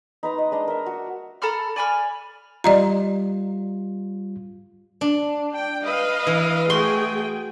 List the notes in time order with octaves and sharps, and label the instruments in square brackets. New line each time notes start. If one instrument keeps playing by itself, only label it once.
[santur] D#4 B4 A#5 C6
D#5
G#3 D4 D#5
A#4 E5
F#4
[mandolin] A4 A#5 B5 F6
D5 G#5 B5 F6
[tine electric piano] G3 F4 [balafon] D5 D#5 A#5
[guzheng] D4
[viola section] G5
B4 D#5 F5
[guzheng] E3
[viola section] A3 G#4 G5 [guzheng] F#4 C6